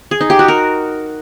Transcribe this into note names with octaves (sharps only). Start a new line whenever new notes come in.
G#4
D#4
G4
F#4
A#4